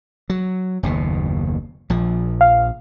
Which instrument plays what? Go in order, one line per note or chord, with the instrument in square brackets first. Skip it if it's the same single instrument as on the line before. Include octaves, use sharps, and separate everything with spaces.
[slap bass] F#3
F#1 D#2 B2
A#1 F3
[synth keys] F5